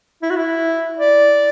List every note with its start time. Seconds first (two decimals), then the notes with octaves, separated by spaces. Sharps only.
0.22 E4
0.30 F#4
0.37 E4
0.99 D5